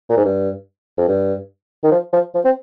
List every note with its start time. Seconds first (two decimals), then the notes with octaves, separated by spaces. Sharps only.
0.10 A#2
0.17 G#2
0.25 G2
0.98 F2
1.09 G2
1.84 D#3
1.91 F3
2.13 F3
2.35 F3
2.45 C4